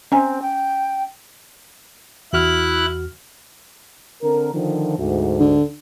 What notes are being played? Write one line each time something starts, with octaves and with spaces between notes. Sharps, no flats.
C4 C#4 G#5
G5
E2 E4 F#4 F6 F#6
D3 C4 A#4
D3 D#3 F3
D2 G#2
D3